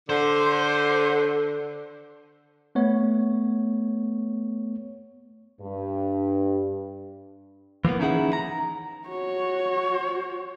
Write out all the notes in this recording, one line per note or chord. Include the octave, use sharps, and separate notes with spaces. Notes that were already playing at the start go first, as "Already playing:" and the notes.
D3 C5
A3 B3 C#5
G2
E3 F3 A#3 B3
C#4 D#4 E4 G#4 F#5
A#5
F#4 C#5